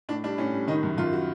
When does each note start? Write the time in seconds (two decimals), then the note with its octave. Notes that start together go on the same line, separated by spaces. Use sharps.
0.09 A2 D4
0.24 G3 D4
0.38 A2 C#4
0.53 G3
0.68 D#3 D#4
0.83 F#2
0.98 F#2 F4
1.13 F#4